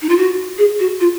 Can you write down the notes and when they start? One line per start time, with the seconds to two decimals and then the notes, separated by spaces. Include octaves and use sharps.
0.02 D#4
0.09 F4
0.17 F#4
0.58 G#4
0.79 F#4
1.00 F4